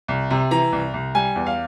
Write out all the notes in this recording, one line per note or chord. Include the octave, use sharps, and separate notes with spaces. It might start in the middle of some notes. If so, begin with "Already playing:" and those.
C2
C3
E3 A#5
C2
C2
G3 G#5
E2
F5